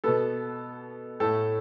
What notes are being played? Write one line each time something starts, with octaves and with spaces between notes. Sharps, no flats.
B2 B3 A4
A2 A3 A4